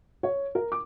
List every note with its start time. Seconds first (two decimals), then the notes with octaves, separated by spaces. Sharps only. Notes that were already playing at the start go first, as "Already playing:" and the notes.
0.23 C#5
0.55 A#4
0.72 D6